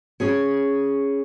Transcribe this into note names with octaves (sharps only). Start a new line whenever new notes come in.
C#4 G#4 C#5